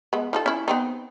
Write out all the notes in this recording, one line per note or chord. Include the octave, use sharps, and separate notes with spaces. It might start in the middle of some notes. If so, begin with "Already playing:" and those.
G#3 B3
F3 D#4 A4
C#4 E4
B3 C4 D#4